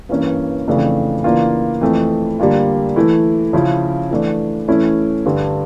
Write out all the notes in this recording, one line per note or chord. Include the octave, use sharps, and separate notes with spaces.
G2 E3 A#3 C#4
F2 C#3 E3 A3 D4
C#3 E3 A#3 D4 F4
F2 E3 A3
D3 G3 A#3 D4 F4
E3 A3 E4
C#3 F3 C#4 E4
E3 A3 D4
E3 A3 C#4 E4
G2 D3 G3